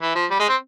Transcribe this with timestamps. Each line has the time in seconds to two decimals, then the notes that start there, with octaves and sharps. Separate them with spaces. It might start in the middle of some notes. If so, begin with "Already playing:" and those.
0.02 E3
0.15 F3
0.31 G3
0.40 G#3
0.49 C4